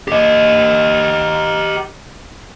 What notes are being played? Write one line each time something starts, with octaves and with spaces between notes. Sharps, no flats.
G4 D#5